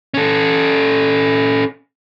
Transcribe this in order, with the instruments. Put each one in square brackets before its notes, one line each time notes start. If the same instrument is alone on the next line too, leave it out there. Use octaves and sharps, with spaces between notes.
[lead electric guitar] C#4 A4